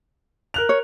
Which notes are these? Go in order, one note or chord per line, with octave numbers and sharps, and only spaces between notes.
A#4 F#6 F7
C#5